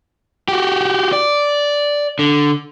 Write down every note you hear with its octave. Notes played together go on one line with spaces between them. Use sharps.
F#4 G4
D5
D3